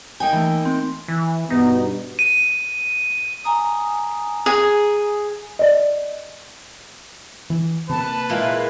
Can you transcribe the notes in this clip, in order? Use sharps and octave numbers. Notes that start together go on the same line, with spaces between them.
A#3 D#4 G5 G#5
E3 A3
C4
E3
G2 B2 B3 D#4
D#7
G#5 A#5 D#6
G#4
D5 D#5
E3
C3 A#3 B4 A5
A#2 G#3 E4 F4